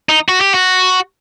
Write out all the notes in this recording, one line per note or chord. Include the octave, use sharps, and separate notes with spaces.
D#4
F#4
G4
F#4